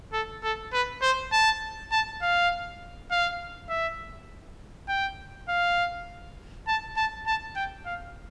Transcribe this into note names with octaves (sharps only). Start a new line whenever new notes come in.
A4
A4
B4
C5
A5
A5
F5
F5
E5
G5
F5
A5
A5
A5
G5
F5